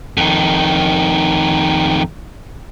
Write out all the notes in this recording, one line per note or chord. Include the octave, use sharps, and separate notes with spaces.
F2 D#3